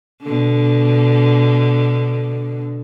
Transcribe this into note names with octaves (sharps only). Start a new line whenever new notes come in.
B2 D3